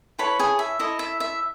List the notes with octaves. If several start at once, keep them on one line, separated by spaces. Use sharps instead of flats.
E4 A4 B4 C#5 B5
G#4 G#5
E5
E4 A4 C#5 D#5
E5
E5